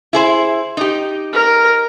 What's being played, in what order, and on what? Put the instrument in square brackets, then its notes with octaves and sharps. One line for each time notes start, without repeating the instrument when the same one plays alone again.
[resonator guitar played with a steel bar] E4 G#4 C5
D#4 G4
[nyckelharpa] A#4